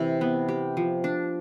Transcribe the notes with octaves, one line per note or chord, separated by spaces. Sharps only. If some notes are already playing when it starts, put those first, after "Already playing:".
Already playing: C3 E3 E4
B3
G4
F3
D4